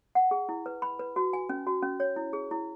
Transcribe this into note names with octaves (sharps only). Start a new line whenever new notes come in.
F#5
G#4
E4
B4
B5
B4
F#4
G#5
C#4
F#4
C#4
C#5
E4
G#4
E4